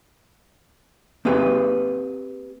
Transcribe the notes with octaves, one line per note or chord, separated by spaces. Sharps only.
A#3 C4 G4 G#4 B4